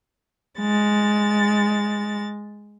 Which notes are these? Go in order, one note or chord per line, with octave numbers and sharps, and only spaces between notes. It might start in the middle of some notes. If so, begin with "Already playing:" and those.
G#3 A6